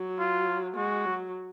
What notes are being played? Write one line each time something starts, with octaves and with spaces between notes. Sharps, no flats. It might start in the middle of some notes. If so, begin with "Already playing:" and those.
Already playing: F#3
F4
G#3 F#4
F#3